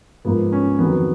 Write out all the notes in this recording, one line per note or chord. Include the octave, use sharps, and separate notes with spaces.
G#2 F3 A#3 B3
C#4
F2 D#3 F#3 B3